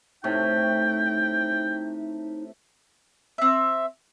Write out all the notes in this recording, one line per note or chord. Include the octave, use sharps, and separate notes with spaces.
A2 C3 A3 D#4 G5
C4 E5